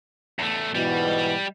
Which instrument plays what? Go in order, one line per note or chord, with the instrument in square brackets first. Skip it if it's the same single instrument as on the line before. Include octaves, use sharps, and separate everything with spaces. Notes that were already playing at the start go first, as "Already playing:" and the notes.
[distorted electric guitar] E2 A3
[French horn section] G#2 B2 E3 [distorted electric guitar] G3